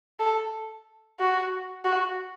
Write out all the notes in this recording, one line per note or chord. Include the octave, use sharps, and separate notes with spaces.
A4
F#4
F#4